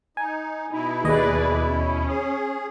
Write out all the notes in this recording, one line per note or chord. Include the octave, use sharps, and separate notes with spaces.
D#4 G#5
B2 D#4 E4
D#2 G#4 B4 D5 D#5
C#4
G#4